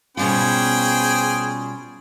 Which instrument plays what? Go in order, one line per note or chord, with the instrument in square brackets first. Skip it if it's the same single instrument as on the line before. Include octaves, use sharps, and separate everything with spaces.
[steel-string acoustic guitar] B2 G3 F4 [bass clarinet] C#4 [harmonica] G#4 C5 G5